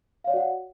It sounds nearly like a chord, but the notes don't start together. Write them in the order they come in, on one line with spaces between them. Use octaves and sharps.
F5 C#5 D5 F#4 F#5